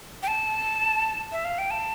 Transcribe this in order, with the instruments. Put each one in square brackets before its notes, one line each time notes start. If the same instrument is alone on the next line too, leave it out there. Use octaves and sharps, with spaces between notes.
[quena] G5
A5
E5
F5
G5
A5